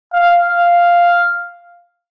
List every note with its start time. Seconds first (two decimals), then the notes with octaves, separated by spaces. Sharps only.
0.13 F5
0.48 F5